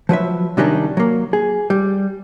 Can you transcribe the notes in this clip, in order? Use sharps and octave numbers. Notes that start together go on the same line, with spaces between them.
F3 F#3 B4 E5
C3 D#3 F#3 G3 C#4 D4
F#3 A#3
G#4
G3